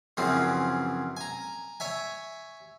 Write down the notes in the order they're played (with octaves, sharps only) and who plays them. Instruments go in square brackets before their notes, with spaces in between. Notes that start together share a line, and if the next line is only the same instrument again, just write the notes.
[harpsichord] F#2 C#3 E3 F3 C4
G#5 A#5
C#5 E5 G#5